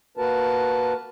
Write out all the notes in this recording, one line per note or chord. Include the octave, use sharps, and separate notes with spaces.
A#3 F#4 A#4 B4 A5